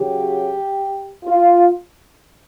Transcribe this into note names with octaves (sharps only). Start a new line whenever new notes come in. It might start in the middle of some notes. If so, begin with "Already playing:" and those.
Already playing: C#3 F#3 G4
F4